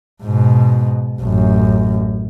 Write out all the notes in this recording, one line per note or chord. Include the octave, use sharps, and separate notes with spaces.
G#2 B2
A1 F#2